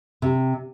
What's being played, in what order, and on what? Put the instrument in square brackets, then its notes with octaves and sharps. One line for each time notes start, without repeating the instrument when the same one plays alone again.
[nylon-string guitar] C3